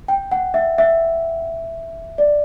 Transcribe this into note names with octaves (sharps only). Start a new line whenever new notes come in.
G5
F#5
E5
E5
D5